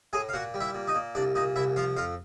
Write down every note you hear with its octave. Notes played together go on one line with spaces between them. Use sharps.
A2 G#4 G#5
F5
A#2 F#4 F#5
G3
E4 E5
A#2
D#4 D#5
A#2
C2 D4 D5
A#2 D#4 D#5
C2 E4 E5
F3 F4 F5
F2 F4 F5